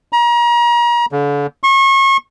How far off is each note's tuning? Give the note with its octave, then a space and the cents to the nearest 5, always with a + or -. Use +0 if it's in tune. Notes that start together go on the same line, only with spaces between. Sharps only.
A#5 +35
D3 -40
C#6 -35